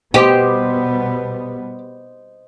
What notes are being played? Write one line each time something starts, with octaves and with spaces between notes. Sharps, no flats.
B2 G3 B3 G4 C5 D#5